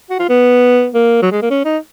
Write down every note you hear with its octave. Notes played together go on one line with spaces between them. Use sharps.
F#4
F4
B3
A#3
F#3
G#3
A#3
C#4
D#4